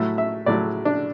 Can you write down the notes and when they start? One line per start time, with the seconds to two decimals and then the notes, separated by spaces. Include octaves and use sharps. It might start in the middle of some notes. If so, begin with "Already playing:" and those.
Already playing: A2 F#3 A3 E5
0.18 E5
0.46 A2 F#3 A3 D5
0.85 D4